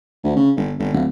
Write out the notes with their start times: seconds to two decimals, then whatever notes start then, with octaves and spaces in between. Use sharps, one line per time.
0.24 D2
0.36 C#3
0.56 G1
0.79 G1
0.93 D1